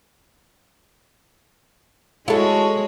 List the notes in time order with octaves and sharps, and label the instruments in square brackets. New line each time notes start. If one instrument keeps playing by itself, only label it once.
[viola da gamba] G#3 F#4 C#5 [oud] E4 A4